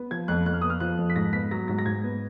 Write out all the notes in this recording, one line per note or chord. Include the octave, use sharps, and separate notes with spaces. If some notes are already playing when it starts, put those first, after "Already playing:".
Already playing: B3
F3 G#6
F2 F#6
F2 F#6
F6
B3 D#6
F6
F3 F#6
F2
B6
G#2 A#6
B3 B6
F#3 A#6
G#2 A#6
A#6
G#2 G#6
B3